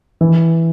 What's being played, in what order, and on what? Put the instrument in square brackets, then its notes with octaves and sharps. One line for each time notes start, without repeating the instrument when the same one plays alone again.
[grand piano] E3